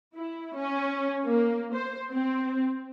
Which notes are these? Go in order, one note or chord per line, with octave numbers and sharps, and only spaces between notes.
E4
C#4
A#3
C5
C4